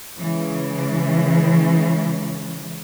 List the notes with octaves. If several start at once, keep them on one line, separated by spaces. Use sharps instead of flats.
C#3 E3 G#3